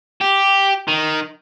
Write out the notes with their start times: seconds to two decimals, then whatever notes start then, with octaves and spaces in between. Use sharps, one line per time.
0.21 G4
0.88 D#3